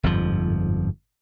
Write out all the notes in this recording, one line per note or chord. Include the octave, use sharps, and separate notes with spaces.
G1 F2 G#2 F3